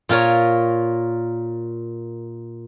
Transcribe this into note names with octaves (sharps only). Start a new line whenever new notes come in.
A#2 F4 A#4 C#5